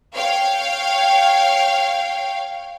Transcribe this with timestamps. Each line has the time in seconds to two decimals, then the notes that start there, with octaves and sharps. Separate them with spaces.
0.15 C#5 F5 G5